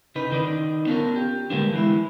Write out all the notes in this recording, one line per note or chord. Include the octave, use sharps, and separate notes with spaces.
C#3 D#4 B4
D3 D#3 D#4 D5
B3 C#4 D4 F4 G#4 A#4
G4
D3 G3 G#3 A#3 B3 D4
E3 G#3 E4